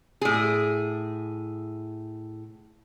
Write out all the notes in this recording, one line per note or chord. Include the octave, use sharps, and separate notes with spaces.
A2 G#4